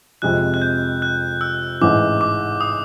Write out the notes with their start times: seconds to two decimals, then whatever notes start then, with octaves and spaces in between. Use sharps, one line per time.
0.22 F2 C3 F3 G#3 F#6
0.54 F#6
0.62 G6
1.02 F#6
1.41 E6
1.81 A1 G#2 E3 D6
2.21 D6
2.61 D#6